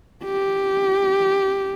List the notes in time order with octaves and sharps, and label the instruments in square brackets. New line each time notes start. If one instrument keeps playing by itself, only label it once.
[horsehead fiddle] G4